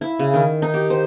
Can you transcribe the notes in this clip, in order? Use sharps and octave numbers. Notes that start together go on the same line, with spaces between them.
E4
C#3
D#3
D#4
G4
C5